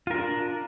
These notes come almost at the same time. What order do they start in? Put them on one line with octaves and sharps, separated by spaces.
F4 A#4 D4